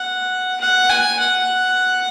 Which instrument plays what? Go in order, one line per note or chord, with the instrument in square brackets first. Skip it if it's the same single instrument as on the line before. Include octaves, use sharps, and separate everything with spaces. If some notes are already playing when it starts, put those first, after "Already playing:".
Already playing: [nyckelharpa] F#5
F#5
G#5
F#5